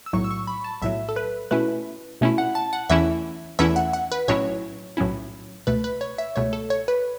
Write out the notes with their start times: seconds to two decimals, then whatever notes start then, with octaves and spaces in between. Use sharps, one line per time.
0.06 E6
0.13 B1 A2 F#3 C#6
0.24 E6
0.31 C#6
0.47 B5
0.64 A5
0.82 B1 A2 F#3 E5
1.09 A4
1.16 B4
1.51 B2 A3 C#4 E4 B4
2.21 B2 A3 C#4 E4
2.38 F#5
2.55 A5
2.73 F#5
2.89 E2 E3 A3 C#4 E4 E5
3.59 E2 E3 A3 C#4 E4 E5
3.76 F#5
3.93 F#5
4.12 B4
4.28 B1 A2 F#3 C#4 E4 C#5
4.97 B1 A2 F#3 C#4 E4
5.67 C#2 B2 A3 B4
5.84 B4
6.01 C#5
6.18 E5
6.36 C#2 B2 A3 C#5
6.53 A4
6.70 C#5
6.88 B4